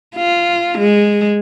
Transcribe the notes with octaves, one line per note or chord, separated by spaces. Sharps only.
F4
G#3